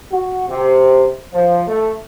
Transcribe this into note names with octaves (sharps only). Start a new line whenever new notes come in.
F#4
C3
F3
A3